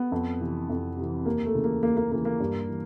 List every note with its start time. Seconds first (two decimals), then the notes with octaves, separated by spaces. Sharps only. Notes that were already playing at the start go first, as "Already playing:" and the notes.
Already playing: B3
0.12 F2
0.40 C3 E3
0.69 F2
0.97 C3 E3
1.26 D#2 A#3
1.45 A3
1.55 C#3 E3
1.64 A#3
1.83 D#2 A#3
1.97 A#3
2.11 C#3 E3 A#3
2.25 A#3
2.40 G2
2.68 E3